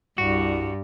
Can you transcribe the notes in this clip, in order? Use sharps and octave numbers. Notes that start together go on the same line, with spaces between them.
C2 G2 F#4